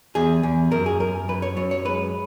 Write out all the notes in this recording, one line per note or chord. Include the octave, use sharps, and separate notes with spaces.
E2 G#4
E2
F#2 A#4
G#4
F#2 A#4
F#2 B4
C#5
F#2 C#5
C#5
G#3 B4